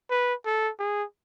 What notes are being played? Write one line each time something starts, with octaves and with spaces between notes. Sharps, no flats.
B4
A4
G#4